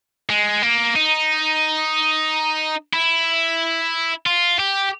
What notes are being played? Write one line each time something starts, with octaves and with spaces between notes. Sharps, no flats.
G#3
A#3
D#4
E4
F4
G4